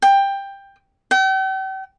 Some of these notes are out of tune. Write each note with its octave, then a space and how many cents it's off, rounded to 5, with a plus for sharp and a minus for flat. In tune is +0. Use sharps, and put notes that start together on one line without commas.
G5 +15
G5 -40